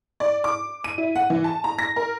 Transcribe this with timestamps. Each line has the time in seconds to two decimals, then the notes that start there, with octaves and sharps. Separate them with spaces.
0.20 D5
0.44 D6
0.84 D#7
0.98 E4
1.16 F#5
1.30 E3
1.44 A5
1.64 A#5
1.79 A#6
1.96 A#4